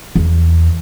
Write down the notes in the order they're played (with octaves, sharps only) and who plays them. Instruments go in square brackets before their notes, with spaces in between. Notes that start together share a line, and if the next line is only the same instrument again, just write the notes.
[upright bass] E2